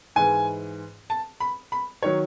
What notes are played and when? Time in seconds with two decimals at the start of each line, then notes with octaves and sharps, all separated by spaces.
0.16 G#2 E3 G#3 G#5
1.10 A5
1.40 B5
1.72 B5
2.03 D#3 F#3 C#5